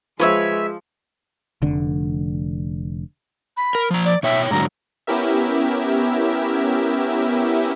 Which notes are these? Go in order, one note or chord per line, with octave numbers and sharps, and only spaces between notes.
F3 G#3 B4 C#5 E5
F1 D3
B5
A#4
F3 A#5
D5
B2 C#5 E5 G5
G#2 D3 F#3 A#5
B3 C#4 E4 G4 A#4 E5